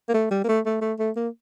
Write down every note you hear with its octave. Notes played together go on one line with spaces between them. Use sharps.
A#3
A3
G3
A#3
A3
A3
A3
A3
A#3